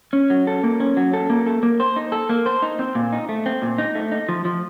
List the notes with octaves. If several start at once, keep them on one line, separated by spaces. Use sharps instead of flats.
C#4
F#3
A4
A#3
C#4
F#3
A4
A#3
A4
A#3
C5
D#4
A4
A#3
C5
D#4
C4
A#2
D#4
A3
C4
A#2
D#4
A3
D#4
F3
F3